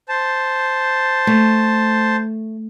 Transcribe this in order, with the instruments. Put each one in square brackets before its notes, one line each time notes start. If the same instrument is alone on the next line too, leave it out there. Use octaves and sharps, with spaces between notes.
[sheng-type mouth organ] C5 A5
[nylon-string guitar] A3